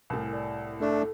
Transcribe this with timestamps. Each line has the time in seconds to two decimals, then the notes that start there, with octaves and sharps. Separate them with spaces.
0.10 C2 A2 A#4 G#5
0.33 D5
0.81 A3 D4 A4